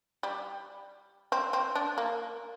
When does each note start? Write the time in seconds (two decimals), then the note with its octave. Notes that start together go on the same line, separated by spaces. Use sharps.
0.23 G3
1.32 C4
1.53 C4
1.75 D4
1.98 A#3